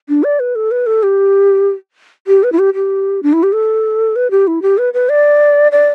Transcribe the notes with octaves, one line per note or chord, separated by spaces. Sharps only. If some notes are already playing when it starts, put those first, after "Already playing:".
D4
D5
B4
A4
B4
A4
G4
G4
B4
E4
G4
G4
D4
E4
G4
A4
B4
G4
E4
G4
B4
B4
D5
D5